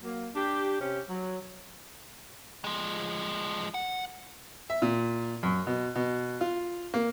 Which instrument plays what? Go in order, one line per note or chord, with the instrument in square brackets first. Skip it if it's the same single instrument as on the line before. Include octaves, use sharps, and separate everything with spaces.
[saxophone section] F#3 A#3
D4 G4
C3 C#4 G4
F#3
[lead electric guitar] F3 G#3
F#5
[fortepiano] E5
A#2
F#2
B2
B2
F4
A#3